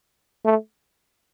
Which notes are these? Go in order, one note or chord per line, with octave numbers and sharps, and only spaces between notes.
A3